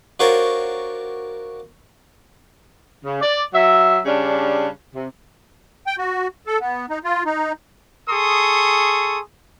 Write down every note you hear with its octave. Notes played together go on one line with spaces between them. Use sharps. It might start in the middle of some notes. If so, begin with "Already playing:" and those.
D4 F4 F#4 A#4 C5 C#5
C#3
D5
F#3 E5
C#3 G3 C#4 D4
C3
G5
F#4
A4
B3
D#4
F4
D#4
G#4 A4 C6 C#6 D#6